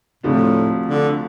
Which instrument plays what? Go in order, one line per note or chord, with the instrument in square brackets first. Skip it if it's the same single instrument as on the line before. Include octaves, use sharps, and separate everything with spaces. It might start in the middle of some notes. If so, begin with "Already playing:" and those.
[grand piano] D2 C3 F3 D4 [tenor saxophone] A2
[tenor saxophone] D3